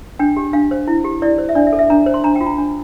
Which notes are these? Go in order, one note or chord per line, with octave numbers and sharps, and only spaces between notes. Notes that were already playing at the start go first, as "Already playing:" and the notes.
D4 G5
G4
D4 F5
C5
E4
G4
E4 D5
C5
E5
D4 D5
E5
A4
E5
D4 A#5
C5
C6
D4 A#5
G5
F4
A#5
D4